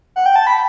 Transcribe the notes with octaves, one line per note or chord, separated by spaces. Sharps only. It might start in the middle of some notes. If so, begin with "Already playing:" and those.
F#5
G5
A5
B5